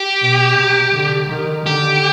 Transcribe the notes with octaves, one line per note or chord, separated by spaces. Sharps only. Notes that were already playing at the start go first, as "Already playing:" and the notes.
Already playing: G4
B2
C3
D3
D#3
D3 G4